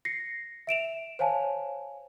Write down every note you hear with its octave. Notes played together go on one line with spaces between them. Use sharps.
A#6 C7 C#7
E5 D7 E7 F7
C5 C#5 F5 G#5 A5